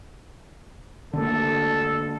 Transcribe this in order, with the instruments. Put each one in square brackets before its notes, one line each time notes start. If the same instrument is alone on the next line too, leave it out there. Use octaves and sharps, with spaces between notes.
[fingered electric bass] D3 A3 A#3 [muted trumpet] A4